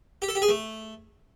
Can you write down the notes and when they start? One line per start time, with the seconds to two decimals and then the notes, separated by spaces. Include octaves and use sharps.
0.22 G4
0.29 A4
0.35 G4
0.42 G#4
0.49 A3